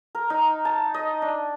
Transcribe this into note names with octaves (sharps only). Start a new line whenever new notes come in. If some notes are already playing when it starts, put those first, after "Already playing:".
A#4
D#4
A5
D#5
D4